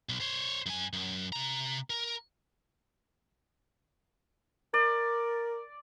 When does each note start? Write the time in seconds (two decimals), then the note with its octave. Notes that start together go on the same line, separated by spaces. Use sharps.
0.09 B1
0.21 C5 C#5
0.66 F#2 G#5
0.93 F#2
1.33 C3 A#5
1.90 A#4
4.74 A#4 D5